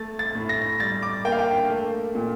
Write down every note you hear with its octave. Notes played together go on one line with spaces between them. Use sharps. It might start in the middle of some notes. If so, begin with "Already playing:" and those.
Already playing: A3 A6
A6
A2
A#6
G3 A6
D6
A#3 G5
F5
G5
A3
A#2